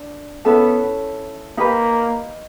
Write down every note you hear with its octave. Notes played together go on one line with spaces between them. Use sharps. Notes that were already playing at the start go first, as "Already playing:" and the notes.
Already playing: D4
B3 C#4 E4 A4
A#3 D#4 G4 B4